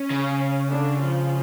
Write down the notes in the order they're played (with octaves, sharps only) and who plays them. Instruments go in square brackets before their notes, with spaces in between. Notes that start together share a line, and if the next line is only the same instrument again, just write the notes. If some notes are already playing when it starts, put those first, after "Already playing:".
Already playing: [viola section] C#4
[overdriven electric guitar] C#3
[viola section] D3 D4
F3 F4